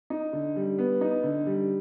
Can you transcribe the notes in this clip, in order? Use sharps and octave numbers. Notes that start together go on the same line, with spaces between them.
D#4
D3
G3
B3
D#4
D3
G3